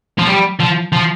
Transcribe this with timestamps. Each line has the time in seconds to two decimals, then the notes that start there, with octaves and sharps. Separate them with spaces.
0.18 F3
0.27 G3
0.60 F3
0.93 F3